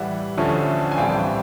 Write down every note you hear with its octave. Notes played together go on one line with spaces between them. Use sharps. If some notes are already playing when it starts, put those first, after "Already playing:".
Already playing: A2 E3 G3 E5 F#5
D2 D3 F3 A3 C#4
G#5
A#1 A2 E3 G3 C4 F5 G5